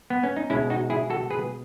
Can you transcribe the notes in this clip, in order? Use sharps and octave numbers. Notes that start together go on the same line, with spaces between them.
B3
C#4
D#4
B2 G#3 C#4 E4
D#4 F#4
E4 G#4
F#4 A4
G#4 B4